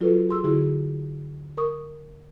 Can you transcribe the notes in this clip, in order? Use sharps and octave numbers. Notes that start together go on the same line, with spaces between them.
F#3 F4 F#4 A4 B4
G#4 C6 E6
D3 E4 F#4 G#4
A#4 C#6 D#6